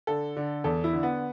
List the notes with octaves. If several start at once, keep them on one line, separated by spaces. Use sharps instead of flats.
D3 A4
D3
E2 A4
E4
D3
B3